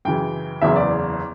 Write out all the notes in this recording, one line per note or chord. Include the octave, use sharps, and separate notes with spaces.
F#2 C#3 E3 G5
F#1 E2 C#3 E3 E5
D5